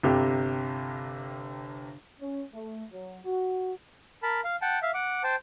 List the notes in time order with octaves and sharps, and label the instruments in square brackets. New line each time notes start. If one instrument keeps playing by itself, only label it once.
[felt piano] G1 C3 G4
[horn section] C#4
A3
F#3
F#4
[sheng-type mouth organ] A#4 A5 B5
F5
F#5 G5 A5
E5 F5
F#5 D6
C5 G5 A5